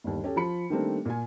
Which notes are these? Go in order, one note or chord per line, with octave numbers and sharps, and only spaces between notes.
G1 D#2
C#4 G4 A4
F3 F4 B5 C#7
D#3 G3 A3 A#3 C4 D4
A#2 F4 G#5